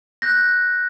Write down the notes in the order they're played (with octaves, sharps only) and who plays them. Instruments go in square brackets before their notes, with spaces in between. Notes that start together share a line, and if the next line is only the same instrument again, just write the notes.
[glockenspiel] F#6 G6 A#6